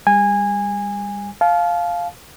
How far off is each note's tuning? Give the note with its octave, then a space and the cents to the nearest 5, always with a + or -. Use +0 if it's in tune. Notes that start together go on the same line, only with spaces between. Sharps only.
G3 +30 G#5 -20
F5 +0 A5 -35